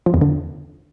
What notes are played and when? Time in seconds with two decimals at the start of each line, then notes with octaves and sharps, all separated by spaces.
0.06 F3
0.14 E2
0.21 D3